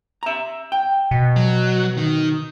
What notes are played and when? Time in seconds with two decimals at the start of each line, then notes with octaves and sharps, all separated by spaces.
0.23 E5 A#5
0.72 G5
1.11 B2
1.36 F#3
1.98 D#3